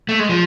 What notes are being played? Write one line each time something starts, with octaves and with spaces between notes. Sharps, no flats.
A3
G#3
F3